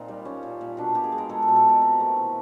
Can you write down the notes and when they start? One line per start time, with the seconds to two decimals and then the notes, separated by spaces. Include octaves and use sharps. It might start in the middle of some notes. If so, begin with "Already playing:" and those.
Already playing: A#2 C4 D#4 F4
0.08 G3
0.25 G3 C#4
0.43 A#2
0.61 A#2
0.77 B2 D4
0.94 B2 G4
1.04 G#4
1.12 G#3
1.18 A#4
1.29 G#3 A4
1.42 A4
1.48 B2
1.56 A4
1.65 B2 A#4
1.82 C3
2.00 A3
2.16 E3